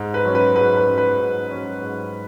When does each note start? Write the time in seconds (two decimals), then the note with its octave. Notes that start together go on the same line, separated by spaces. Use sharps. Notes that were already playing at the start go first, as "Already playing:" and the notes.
Already playing: G#2
0.14 B4
0.25 F#3 C#4
0.35 B4
0.56 G#2 B4
0.77 B4
0.87 F#3 C#4
0.98 B4
1.19 G#2
1.51 F#3 C#4
1.82 G#2